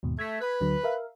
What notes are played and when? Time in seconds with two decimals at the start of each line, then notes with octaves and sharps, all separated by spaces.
0.03 D#2 G#2 B2
0.19 A3 G#6 B6
0.40 B4
0.61 D2 D3 F#3
0.84 A#4 E5 F5